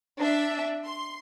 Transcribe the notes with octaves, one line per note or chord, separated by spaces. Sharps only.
D4 E5
C6